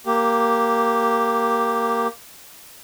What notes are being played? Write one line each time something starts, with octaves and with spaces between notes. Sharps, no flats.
A#3 G4